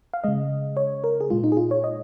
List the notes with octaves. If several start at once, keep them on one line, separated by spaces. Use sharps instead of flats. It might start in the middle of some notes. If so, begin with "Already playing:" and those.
F5
C#3 G#3 D#5
C#5
A#4
G#4
A#2 G#3 F4
D#4
G#4
F4
C#5
D#5